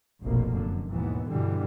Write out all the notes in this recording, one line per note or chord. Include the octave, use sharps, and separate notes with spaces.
F1 A#1 B2 A#3
F#2 D3
D#2 G#2 B2 E3 B3
G2 B2 D3 E3 G3